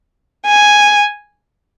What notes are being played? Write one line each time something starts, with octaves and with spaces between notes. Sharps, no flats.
G#5